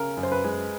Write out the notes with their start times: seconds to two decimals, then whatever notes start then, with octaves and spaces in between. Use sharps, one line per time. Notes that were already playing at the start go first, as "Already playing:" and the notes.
Already playing: C#3 A#4
0.17 F#2
0.23 C5
0.32 B4
0.44 G#3